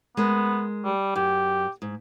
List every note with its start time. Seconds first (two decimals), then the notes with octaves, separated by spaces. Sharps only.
0.17 G#3 B3 A#4
0.85 G3
1.16 F#2 G4
1.82 G#2